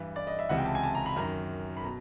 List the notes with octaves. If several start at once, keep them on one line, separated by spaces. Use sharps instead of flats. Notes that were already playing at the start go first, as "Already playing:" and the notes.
Already playing: G2 E3 B4
D5
D#5
E5
C#2 C3 E3 F#5
G5
A5
G#5
A5
A#5
B5
F#2 D#3 A#5
B5
B2 A#5